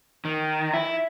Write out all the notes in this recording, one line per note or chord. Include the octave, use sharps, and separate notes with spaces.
D#3
E4